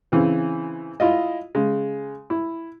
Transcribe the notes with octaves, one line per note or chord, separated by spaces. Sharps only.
C#3 E3 C4
E4 F4 D#5
C#3 G#3
E4